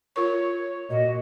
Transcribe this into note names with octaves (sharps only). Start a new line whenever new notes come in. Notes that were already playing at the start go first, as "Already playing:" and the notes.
F4 A#4 C#5 C#6
A#2 F#4 D#5